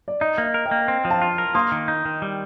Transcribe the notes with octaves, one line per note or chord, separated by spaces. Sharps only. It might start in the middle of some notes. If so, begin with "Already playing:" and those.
D5
D#4 D#5
A#3
D#5
A#4
D#5 G5
A#3
C4
F3
F5 A5
F4
A#4
A#3 C6 D#6
D#3
D#4
D#3
G3